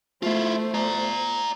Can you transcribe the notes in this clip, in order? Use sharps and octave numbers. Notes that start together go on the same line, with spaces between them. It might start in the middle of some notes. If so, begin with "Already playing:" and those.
A3 E4 F4 C5
D5 A#5